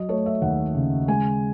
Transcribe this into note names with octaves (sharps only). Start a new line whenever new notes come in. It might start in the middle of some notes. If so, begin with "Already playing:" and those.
Already playing: F#3 D#5
A3 C#5
E5
D#2 F#5
C#3
G#3 G#5